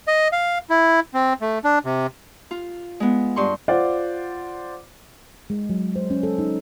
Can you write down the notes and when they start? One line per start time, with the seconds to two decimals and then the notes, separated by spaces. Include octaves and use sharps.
0.08 D#5
0.32 F5
0.70 E4
1.14 C4
1.41 A3
1.64 D4
1.85 C3
2.51 F4
3.00 G#3 B3
3.36 G2 C6 C#6
3.68 F4 C5 D5 F#5
5.50 G#3
5.69 F#3
5.96 C5
6.10 C#4
6.23 A4
6.39 D#4